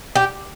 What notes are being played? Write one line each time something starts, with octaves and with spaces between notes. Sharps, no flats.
G4